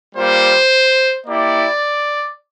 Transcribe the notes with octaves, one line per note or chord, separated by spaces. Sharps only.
G3 A#3 F4 C5
A#3 E4 G4 D5